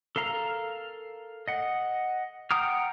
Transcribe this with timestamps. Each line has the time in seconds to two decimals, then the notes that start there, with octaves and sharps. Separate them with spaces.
0.16 A4 A#4 F5 A#5
1.48 D#5 F#5
2.51 F#5 G5 A#5 D#6 F6